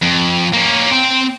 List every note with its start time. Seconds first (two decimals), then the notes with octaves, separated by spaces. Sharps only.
0.02 F2
0.54 A#3 C#4
0.91 C4 G5